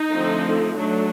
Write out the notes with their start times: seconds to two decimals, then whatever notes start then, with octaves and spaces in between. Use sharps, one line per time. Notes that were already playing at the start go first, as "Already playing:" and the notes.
Already playing: D#4
0.11 D3 F3 A3 C4
0.77 F#3 A3 D4